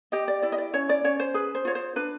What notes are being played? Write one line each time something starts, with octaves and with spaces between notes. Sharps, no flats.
G4 D#5
D5
E4 D5
D#5
D5
C#4 C#5
D5
C#4 C#5
C5
G#4 B4
C5
F4 C#5
C5
D4 B4